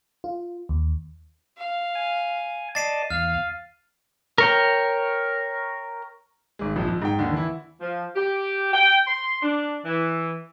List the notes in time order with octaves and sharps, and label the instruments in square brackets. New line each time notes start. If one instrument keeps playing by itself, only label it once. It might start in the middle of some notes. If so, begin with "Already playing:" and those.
[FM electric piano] F4
D#2
[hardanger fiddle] F5
[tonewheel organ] G#5
[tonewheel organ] D5 D#5 A5 [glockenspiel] A6 C7 D#7
[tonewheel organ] E2 [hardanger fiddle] F5 [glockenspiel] F6
[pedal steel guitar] A#4 C#5 G5
[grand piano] G#1 G#3
A#1 F2 F3
F2
G#2 G5
D#2 D3
E3 E4
[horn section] F3
G4
G5
C6
D4
E3